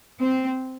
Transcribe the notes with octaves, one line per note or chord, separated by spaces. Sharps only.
C4